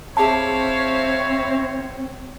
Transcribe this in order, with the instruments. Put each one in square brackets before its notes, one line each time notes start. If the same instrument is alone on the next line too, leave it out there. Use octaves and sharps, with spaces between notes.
[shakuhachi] C4 [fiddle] E4 F5 [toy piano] G#4 A5 [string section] C#5